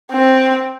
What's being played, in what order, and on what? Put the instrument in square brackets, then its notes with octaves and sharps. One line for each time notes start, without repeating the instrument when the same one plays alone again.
[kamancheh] C4